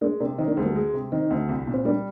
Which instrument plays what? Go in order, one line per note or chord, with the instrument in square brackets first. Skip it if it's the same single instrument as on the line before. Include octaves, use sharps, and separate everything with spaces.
[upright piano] G#3 [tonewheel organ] A#3 D4
[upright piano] C3 [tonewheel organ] A#3 D4
[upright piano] D#3 [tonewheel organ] C4 D#4
[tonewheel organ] A#3 D4
[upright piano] D2 [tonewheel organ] G#3 C4
[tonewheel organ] G3 A#3
[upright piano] G#3
C3
[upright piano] D#3 [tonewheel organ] C4 D#4
[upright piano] D2
C2
A#2
[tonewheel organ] C4
[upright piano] G3 [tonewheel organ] A#3 D4